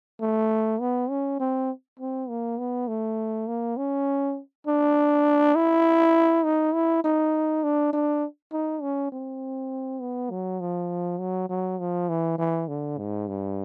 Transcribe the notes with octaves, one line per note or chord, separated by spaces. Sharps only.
A3
B3
C#4
C4
C4
A#3
B3
A3
A#3
C#4
D4
E4
D#4
E4
D#4
D4
D4
D#4
C#4
C4
B3
F#3
F3
F#3
F#3
F3
E3
E3
D3
G#2
G2